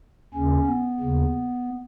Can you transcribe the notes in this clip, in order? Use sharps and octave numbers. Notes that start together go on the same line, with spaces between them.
D#2 C#3 C#4
B3
D#2 C#3